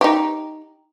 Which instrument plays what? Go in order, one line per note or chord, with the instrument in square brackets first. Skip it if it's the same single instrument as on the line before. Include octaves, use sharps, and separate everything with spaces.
[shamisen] D#4 G4